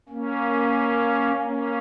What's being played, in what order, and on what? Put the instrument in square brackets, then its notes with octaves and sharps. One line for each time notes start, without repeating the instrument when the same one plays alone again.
[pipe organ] A#3 C#4
A#3 C#4